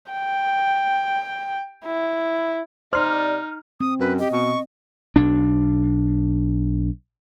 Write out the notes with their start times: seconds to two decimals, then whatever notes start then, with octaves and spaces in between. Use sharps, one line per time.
0.12 G5
1.85 E4
2.93 C3 D#4 C5 D5 C6 F6
3.80 C4 D#6
4.00 F#2 B4
4.19 G4 D#5
4.33 B2 C#6
5.16 B1 D4